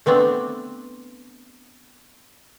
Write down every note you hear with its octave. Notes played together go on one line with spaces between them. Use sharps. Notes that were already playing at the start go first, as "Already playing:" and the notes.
A3 B3 C4 D4